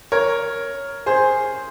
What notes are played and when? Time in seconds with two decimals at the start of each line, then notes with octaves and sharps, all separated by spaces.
0.12 A#4 C#5
1.06 G#4 C5